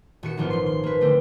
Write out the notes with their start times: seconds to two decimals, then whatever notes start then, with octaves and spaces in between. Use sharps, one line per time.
0.23 D#1 F#4 C#7
0.37 G#1 D#3 F3 B3 F4
0.50 F3 C6
0.66 C6
0.83 A#3 B4
1.01 D3 A3 C4